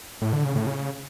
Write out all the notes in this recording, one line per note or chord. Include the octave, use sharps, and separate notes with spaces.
A2
D3
C#3
A2
C#3